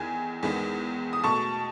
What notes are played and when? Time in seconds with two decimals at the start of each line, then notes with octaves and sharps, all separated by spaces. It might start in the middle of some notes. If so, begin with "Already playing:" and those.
Already playing: E2 D#3 G#5
0.43 E2 D#3 G#3 B3
1.13 D#6
1.24 B2 A3 A5 C#6